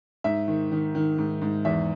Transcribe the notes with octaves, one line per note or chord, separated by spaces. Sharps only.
G#2 E5
D#3
D#3
D#3
G#2
G#2
E2 E5